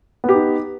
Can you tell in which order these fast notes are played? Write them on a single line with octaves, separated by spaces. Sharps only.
B3 G4 D#4